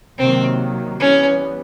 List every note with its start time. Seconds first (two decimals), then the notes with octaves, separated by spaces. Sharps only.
0.18 C3 D#3 F#3 A#3 C4
1.00 E3 G3 B3 C#4